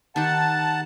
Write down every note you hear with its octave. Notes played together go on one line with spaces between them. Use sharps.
D#3 G4 F#5 A5